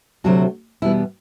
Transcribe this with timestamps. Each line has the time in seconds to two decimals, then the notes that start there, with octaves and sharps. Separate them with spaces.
0.24 D2 C3 F#3 A3 F#4
0.82 E2 B2 G3 B3 E4